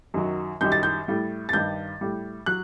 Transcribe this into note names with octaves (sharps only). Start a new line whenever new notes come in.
F#2 D#3 F#3
F#2 D#3 G3 G6
A6
G6
A2 G3
A6
G2 D#3 G3 G6
A2 G3
F#3 F#6